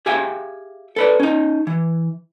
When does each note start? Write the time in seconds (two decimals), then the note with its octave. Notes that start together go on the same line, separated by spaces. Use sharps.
0.06 G4 G#4 E5 F5 G5 G#5
0.96 A4 B4 D5
1.20 C#4 D#4
1.67 E3